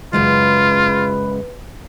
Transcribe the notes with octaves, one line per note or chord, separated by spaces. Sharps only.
F#2 C#3 G#3 F4 B4